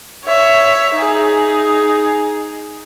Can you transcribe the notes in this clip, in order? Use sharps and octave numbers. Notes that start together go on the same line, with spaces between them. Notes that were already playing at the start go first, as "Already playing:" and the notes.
C#5 E5
D#4 G#4